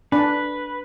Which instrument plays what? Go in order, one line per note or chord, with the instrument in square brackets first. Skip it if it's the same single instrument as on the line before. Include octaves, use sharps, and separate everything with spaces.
[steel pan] D4 [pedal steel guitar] B4